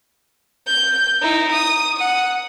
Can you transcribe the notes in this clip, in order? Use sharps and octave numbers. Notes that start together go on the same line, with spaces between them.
G6
D#4 E4
D#6
F#5 D#6